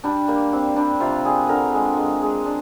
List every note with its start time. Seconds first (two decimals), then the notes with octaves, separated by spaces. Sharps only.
0.04 G3 D4
0.28 G3 A#3
0.53 G3 C4
0.76 G3 D4
1.00 C3 F4
1.25 G3 G#4
1.49 D3 A#4
1.74 G#3
1.98 G#3
2.22 G#3 G#4
2.46 D4